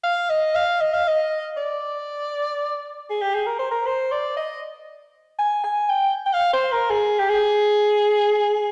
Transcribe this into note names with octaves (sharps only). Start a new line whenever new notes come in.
F5
D#5
F5
D#5
F5
D#5
D5
G#4
G4
G#4
A#4
C5
A#4
C5
D5
D#5
G#5
G#5
G5
G5
F5
C5
A#4
G#4
G4
G#4